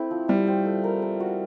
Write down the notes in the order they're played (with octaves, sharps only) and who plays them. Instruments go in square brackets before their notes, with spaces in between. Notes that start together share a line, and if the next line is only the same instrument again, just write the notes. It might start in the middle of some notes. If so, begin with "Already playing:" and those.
Already playing: [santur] A3 C4 E4
F3
[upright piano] G3 [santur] E4
[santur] C4
A3
A#4
A#4
F#4